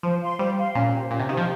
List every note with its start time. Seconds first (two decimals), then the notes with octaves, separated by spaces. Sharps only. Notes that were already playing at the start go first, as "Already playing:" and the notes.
0.03 F3 C5
0.21 F5 C6
0.38 G3 C5
0.57 F5 C6
0.75 A#2 C#4
0.93 G4 C5
1.11 A#2 C#4
1.19 C3
1.29 D#3 G4 C5
1.37 F3